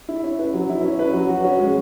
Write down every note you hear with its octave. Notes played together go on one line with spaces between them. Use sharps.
E4
C#4
B4
F#3
E4
C#4
B4
F#3
F#4
C#4
G#3